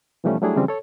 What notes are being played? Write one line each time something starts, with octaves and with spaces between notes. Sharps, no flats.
B2 E3 F3 G3 A3 C#4
F#3 G3 A3 D4 E4 G#4
C#3 E3 F3 G3 C4 C#4
A4 C#5